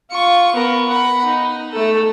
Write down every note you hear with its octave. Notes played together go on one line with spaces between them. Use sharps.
F4 C#6
B3 A#4
F#5 B5
D#4
A3 A4